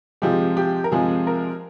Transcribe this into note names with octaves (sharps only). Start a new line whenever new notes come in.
C3 F3 G#3 G4
G4
A#4
C3 F3 G#3 G#4
A#4